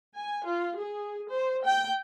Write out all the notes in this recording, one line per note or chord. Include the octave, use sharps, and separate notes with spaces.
G#5
F4
G#4
C5
G5